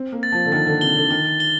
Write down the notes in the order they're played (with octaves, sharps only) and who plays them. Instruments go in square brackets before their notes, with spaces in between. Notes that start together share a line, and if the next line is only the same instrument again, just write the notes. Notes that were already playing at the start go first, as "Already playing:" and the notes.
Already playing: [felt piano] C4
A#3
[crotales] A6
[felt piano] F3
D3
[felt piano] D#3 [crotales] A6
[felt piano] D3
[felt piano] C3 [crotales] G7
[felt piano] D3
[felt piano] D#3 [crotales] G7
[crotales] G7